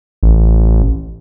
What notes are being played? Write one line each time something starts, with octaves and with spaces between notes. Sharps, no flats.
A1